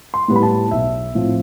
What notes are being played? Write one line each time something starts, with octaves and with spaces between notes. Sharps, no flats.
C6
A2 G3 B3
B5
A5
B1 E5
A2 F3 C4